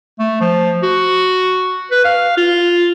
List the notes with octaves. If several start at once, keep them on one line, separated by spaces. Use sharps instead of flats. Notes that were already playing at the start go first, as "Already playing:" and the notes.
A3
F3
F#4
B4
F5
F4